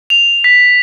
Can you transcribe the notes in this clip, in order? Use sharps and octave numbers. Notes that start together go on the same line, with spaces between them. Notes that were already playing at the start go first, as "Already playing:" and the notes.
F7
B6